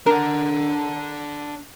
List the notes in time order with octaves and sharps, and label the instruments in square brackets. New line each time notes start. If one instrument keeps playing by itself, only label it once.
[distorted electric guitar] D4 F#5 [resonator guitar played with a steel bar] A#4